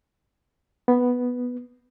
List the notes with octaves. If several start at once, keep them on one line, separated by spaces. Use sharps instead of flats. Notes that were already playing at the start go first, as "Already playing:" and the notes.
B3